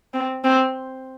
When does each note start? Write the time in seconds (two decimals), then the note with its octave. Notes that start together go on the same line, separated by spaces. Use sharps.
0.14 C4
0.44 C4